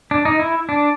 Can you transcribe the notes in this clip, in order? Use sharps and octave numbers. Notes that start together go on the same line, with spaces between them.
D4
D#4
E4
D4